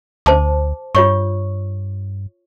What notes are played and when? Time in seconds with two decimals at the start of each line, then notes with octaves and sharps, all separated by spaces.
0.26 D2 C5 A5 D6
0.95 G2 F4 C#5 C#6